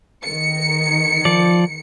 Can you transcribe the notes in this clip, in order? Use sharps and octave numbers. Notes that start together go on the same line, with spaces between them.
D#3 C#7
F3 D5